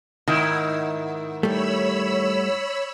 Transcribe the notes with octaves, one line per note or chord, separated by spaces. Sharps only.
G#2 D#3 D#4 E4
G3 A3 C#5 B5 E6